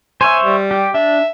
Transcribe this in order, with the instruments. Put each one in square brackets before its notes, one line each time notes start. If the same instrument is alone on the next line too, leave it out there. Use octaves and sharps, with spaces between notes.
[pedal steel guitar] C5 C#5 E5 [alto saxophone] G#5
[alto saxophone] G3
[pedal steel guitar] G4
[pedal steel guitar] D4 [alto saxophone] E5